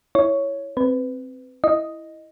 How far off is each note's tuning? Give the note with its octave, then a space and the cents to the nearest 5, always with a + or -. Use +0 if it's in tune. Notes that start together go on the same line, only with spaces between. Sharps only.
E4 +0 C#5 +5
C4 +0 B4 +20
E4 +0 D#5 +0